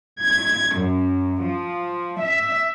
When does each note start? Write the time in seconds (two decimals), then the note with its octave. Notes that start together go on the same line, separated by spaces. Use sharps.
0.22 G#6
0.75 F#2
1.43 F3
2.22 E5